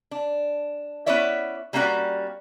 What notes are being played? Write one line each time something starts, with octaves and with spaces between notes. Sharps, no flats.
D4
B3 C#4 E4 C#5 D5 E5
G3 A#3 C#4 D#4 F#4 D5